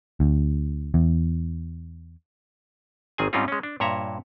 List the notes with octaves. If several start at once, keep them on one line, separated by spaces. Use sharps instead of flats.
D2
E2
G#1 D#3 C4 G#4 G#5
G#2 G3 C4 C#4 D#4 F4
G#3 C#4
D4
G2 A#2 C#5 E5 A#5